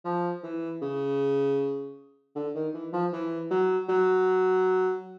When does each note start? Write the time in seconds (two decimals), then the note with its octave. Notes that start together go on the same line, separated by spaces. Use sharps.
0.04 F3
0.43 E3
0.82 C#3
2.35 D3
2.55 D#3
2.74 E3
2.93 F3
3.12 E3
3.50 F#3
3.89 F#3